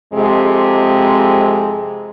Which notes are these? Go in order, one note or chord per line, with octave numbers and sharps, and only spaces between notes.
F2 C3 G#3